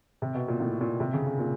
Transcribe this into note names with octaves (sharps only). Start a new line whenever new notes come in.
C3
B2
A#2
A2
A#2
C3
C#3
C#3
A#2